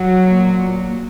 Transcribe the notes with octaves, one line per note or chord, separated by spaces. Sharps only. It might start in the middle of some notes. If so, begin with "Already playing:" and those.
Already playing: F#3
A#2